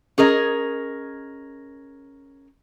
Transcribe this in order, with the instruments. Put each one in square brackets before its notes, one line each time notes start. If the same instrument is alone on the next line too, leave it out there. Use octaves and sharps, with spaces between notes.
[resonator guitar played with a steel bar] C#4 G#4 A#4 D#5